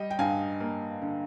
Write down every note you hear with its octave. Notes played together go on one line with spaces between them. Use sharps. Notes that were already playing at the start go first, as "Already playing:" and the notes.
Already playing: G3 D#5 G5
G5
G2 F5 G#5
A#3
D3